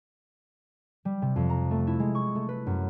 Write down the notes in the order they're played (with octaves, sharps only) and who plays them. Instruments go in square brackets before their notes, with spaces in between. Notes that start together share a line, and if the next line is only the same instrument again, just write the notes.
[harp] G3
C3
F2
A#5
A3
E4
G#3
C#6
A3
B4
F#2